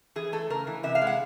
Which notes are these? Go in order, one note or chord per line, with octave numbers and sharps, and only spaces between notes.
E3 G#4
A3 A4
C#3 A#4
E3
C3 E5
F5
G#3
F#5